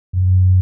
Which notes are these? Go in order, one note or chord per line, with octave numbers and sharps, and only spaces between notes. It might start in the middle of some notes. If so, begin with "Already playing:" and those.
F#2